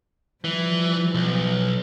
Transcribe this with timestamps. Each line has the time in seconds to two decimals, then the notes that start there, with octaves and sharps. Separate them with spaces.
0.44 E3 F3 G3
1.14 B1